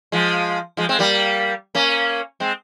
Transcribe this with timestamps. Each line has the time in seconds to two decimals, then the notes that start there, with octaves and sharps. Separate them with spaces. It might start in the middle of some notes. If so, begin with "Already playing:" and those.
0.12 F3 G#3
0.77 F3 G#3
0.89 G#3 C4
0.99 G3 A#3
1.75 A#3 C#4
2.40 G#3 C4